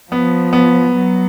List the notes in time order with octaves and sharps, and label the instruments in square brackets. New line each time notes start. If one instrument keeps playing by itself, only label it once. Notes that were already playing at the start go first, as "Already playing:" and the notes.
[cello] F3 [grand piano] B3
[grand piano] B3
[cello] F#3